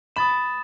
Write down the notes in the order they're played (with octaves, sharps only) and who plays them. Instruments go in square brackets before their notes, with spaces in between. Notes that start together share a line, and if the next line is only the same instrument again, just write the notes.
[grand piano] B5 [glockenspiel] D#6 A6 E7